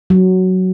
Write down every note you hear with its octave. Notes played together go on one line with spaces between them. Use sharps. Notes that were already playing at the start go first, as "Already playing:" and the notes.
F#3